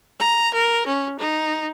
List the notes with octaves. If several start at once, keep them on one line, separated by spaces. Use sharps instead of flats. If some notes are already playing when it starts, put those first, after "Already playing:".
A#5
A#4
C#4
D#4